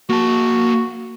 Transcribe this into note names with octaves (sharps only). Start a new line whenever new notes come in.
A#3 F#4 A5